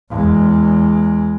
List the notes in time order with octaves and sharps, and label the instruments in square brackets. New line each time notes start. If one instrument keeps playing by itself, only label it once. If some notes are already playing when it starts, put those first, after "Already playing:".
[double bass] E2 G#3